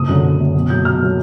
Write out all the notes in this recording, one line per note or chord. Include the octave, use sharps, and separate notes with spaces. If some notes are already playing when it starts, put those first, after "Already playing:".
Already playing: F#1 D#6
F#2 D3
F#1
F#2 D3
B1
A#2 F#3 G6
B1 F6
A#2 F#3